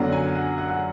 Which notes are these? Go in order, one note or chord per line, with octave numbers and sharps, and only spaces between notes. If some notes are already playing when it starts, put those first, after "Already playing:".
Already playing: F#2 D3 F#3 B3 D4 F#5
G#5
F#5
F#5
F#5